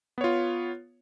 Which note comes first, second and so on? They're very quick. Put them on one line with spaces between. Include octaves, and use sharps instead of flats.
B3 C#5 F4